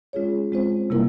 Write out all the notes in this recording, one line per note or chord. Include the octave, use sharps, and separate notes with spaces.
G#3 C#4 F4 G#4 C#5
G#3 C4 F4 C5
C3 G3 A#3 E4 A#4